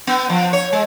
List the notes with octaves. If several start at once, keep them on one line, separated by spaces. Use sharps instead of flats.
B3
F3
C#5
G#3